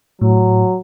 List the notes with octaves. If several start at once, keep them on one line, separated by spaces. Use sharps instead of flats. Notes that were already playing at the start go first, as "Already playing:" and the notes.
A2 F#3